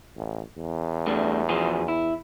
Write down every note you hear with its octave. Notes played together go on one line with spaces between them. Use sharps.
A1
E2
G3 A3 D4
B2 F3 G#4
E4